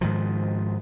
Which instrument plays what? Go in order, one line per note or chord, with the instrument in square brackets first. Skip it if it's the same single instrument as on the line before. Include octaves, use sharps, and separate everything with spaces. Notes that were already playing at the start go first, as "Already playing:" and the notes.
[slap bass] G#2 D#3 F3